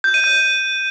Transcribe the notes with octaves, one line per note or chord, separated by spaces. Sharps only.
G6
D#7
G6